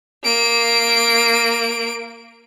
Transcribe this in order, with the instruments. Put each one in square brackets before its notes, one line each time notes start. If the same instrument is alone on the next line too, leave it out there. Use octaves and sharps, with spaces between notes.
[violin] A#3 D7